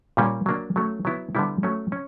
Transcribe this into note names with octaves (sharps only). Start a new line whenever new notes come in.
A#2 G3 A#3 C#4
F#3 A#3 D4
F#3 A3 C#4
F#3 B3 E4
D3 G3 B3 E4
F#3 A3 C#4
C#4